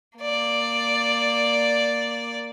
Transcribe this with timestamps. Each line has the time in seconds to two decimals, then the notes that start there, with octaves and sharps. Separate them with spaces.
0.18 A#3 D5